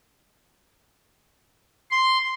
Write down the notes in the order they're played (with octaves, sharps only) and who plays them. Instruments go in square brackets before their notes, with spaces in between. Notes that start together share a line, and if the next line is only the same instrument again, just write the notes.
[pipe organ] C6